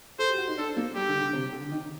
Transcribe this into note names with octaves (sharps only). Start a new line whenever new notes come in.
A4 C5
G4
F#4
D#4
D4 A4
A#3
G3 G4
D3
D3
C3
D3
D#3